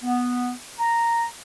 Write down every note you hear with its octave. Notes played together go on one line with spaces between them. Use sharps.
B3
A#5